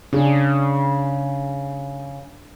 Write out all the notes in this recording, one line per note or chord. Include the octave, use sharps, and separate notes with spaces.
C#3 D4 G#4